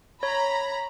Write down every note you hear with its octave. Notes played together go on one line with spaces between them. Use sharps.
C#5 A#5 B5